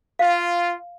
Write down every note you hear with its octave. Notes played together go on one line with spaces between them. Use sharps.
F4 F5